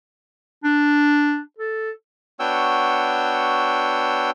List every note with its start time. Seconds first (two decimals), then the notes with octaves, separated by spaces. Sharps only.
0.64 D4
1.58 A4
2.40 B3 D4 F#4 C#5 G5 E6